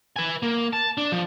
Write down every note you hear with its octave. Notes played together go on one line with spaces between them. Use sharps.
B4 G#5
A#3
A5
D4
F3